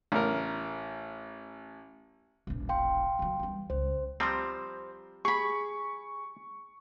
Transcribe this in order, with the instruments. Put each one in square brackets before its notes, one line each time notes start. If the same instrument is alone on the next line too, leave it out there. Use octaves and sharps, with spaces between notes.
[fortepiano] A1 A#4
[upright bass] E1 A#1
[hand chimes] F5 G5 C6
[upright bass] D#3 F#3
E3 G3
[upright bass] C#2 [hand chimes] C5
[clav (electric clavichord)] F3 G3 C4 [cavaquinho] C5 A#5
[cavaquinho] G#4 B5 [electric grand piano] C#6